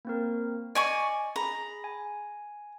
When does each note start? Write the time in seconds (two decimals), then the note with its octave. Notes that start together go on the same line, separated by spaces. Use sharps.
0.05 A#3 C4 A#4
0.75 D5 D#5 G#5 C#6
1.36 G#4 A#5 B5
1.84 G#5